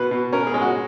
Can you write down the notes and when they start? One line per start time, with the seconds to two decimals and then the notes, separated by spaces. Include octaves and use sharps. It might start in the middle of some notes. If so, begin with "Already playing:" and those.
Already playing: B2 B4
0.11 B2
0.33 C#4 A#4
0.47 G#4
0.54 G#3
0.62 F#4